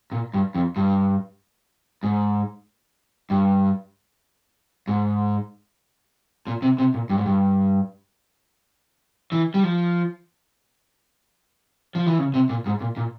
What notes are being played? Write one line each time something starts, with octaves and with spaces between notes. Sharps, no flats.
A#2
G2
F2
G2
G#2
G2
G#2
A#2
C3
C3
A#2
G2
G#2
G2
E3
G3
F3
F3
E3
C#3
C3
A#2
G#2
A#2
A#2